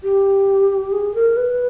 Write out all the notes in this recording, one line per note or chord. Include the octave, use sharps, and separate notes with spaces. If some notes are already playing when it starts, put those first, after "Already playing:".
G4
G#4
A#4
B4